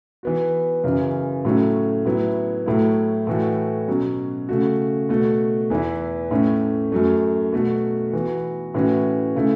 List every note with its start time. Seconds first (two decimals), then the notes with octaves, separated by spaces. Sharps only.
0.23 E3 B3 F#4
0.84 F#2 C#3 E3
1.45 A2 F#3 A3 C#4
2.05 A2 F#3 B3 E4
2.66 A2 F#3 A3 E4
3.27 A2 E3 A3 F#4
3.88 B2 F#3 C#4
4.49 C#3 A3 F#4
5.09 B2 A3 F#4
5.70 E2 E3 B3 E4
6.31 A2 A3 C#4
6.92 F#2 F#3 A3
7.52 B2 A3 F#4
8.13 E3 B3 F#4
8.74 A2 E3 C#4 F#4
9.36 C#3 A3 E4